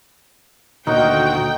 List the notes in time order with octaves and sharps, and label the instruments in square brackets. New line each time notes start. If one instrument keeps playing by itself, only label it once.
[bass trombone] D2 [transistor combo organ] A#2 D#3 F#4 [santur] D#4 [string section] G5